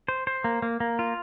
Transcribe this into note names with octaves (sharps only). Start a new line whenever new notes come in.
C5
C5
A#3
A#3
A#3
F4